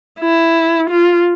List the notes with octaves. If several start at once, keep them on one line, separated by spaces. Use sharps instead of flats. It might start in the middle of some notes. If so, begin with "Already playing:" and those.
E4
F4